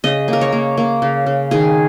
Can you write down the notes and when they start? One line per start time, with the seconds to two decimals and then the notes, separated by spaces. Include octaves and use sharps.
0.04 C#3 D#5
0.28 A#3 A#4
0.41 C#5
0.52 A#3
0.78 A#3
1.02 C#3
1.26 C#3
1.51 D#3 G#4